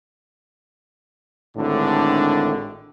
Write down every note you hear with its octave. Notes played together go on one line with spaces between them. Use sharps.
G#1 A2 D3 D4